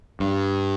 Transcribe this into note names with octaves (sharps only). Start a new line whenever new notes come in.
G2